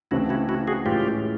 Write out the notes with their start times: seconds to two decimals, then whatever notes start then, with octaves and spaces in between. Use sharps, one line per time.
0.11 C#2 C#3 E3 A3 C4 E4 F#4
0.29 E4 F#4
0.49 E4 F#4
0.68 F#4 G#4
0.85 A2 E3 G#3 C#4 F4 G4